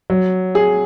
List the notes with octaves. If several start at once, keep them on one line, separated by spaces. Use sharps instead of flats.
F#3
G#4